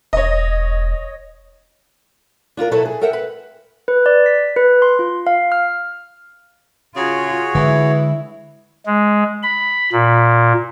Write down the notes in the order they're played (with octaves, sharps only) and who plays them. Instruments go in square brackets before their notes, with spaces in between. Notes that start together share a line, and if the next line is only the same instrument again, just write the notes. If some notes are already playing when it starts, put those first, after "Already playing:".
[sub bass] E1 [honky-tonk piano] C#5 D#5
[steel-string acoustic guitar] D4 F4 F#4 A#4
B2 F#3 E4 A4 B4 C#5
G#4
A4 A#4 E5 F#5 G5
B4
[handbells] B4
D5
B6
B4
C6
F4
F5
F6
[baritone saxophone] C#3 [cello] F4 [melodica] F#4 G#4 C#5
[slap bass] D3 G#3 [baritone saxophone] E3 [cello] E4
[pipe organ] G#3
B5
A#2